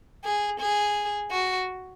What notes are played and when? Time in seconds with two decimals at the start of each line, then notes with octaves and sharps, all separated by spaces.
0.24 G#4
0.60 G#4
1.31 F#4